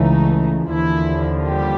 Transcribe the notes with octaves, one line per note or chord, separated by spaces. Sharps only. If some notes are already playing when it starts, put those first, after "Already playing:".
Already playing: C#2 C#3 E3 A3 D#4
D#2 D3 E3 F3 E4
G3 G4